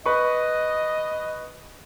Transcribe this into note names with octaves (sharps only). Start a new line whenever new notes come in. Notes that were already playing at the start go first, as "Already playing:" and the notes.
B4 D#5 C#6